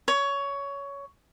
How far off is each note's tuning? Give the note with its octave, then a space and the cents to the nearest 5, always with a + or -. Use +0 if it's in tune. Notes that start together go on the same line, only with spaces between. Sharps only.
C#5 +15